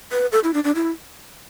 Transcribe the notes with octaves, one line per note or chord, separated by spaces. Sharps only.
B4
A4
E4
D4
D4
E4